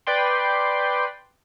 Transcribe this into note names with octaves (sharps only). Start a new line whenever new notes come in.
B4 D5 G5 C6